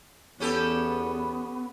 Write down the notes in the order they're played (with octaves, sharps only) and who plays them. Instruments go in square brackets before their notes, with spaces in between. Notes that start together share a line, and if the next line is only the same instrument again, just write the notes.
[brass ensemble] E2 [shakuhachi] B3 [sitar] C#4 G4 A4